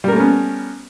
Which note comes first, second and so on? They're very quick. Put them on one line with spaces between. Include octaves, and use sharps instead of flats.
G3 A#4 A3 C#4 B3